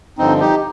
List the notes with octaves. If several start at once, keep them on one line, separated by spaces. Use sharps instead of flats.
G2 D3 F3 C4 D#4
D#4 G4